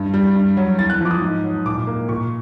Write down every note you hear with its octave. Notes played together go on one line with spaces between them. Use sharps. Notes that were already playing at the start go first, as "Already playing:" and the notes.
Already playing: G2
G3
G2
F#3
E2 A6
F#6
F3 D6
D#6
G#2
F#3
A#2 D6
A#3
A#2 C#6